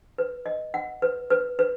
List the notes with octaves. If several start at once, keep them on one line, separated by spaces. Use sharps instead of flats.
B4
D#5
F#5
B4
B4
B4